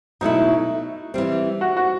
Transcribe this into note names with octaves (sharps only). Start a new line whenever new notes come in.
B2 F#3 A3 D#4 E4
E3 G3 C4
F#4
F#4